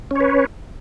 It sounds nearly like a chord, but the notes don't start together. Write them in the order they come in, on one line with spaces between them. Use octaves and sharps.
C#4 C#5 B4